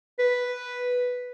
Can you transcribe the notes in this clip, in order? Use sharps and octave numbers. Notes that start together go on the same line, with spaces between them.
B4